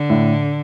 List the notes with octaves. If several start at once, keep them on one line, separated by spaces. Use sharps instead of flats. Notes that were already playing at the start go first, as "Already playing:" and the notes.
Already playing: D3
A2